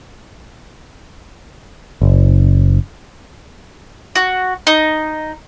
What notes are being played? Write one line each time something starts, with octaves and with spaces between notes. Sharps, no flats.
F#1
F#4
D#4